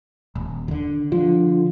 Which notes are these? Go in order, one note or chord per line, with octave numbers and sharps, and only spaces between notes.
D#1
D3 D#3
D3 F3 F4